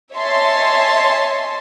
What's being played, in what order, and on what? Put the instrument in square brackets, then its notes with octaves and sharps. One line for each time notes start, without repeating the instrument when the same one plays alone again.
[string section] C#5 D#5 E5 G#5 A5 C6